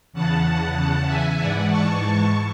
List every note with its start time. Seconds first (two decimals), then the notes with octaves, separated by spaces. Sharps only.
0.13 E2 C#3 E3 F#5 A5
0.76 F#5 A5
1.07 E5 G#5
1.39 G#2 E3 D5 F#5
1.69 A5 C#6
2.01 A5 C#6